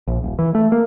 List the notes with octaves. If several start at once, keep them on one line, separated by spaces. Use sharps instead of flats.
A#1
D#1
E3
A3
A#3